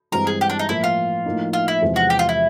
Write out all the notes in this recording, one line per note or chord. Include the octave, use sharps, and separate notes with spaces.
G2 E3 G#3 C4 A#4
G#4
G4
D4
D#4
A2 F3 A#3 E4
F4
A2 F3 A#3 D#4
F4
E4
E2 C3 F3 G#3
F#4
G4
F4
E4